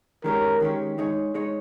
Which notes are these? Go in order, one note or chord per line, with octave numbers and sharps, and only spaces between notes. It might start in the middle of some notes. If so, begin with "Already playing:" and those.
D#3 G#3 C#4 G4 A#4 C#5
D#3 G#3 C#4 G4 C#5
G#3 D#4 G#4 C#5
G#3 D#4 G#4 C#5